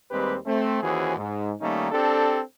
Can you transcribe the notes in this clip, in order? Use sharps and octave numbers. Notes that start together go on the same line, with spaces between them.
D#2 G3 G#3 C4 G4 B4
A3 C4
D#2 E3 C#4 F#4 G#4 C5
G#2
D#3 G3 A3 A#3 C#4 D#4
C4 D4 G4 A4